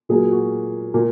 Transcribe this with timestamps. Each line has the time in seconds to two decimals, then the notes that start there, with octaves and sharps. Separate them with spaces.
0.09 A#2 F#3 A#3 G#4
0.31 F#4
0.94 A#2 A#3